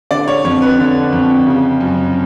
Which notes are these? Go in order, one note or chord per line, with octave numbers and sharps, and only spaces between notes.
D3 D5
C#5
F2 C#5
B4
D3
F2
C#3
F#2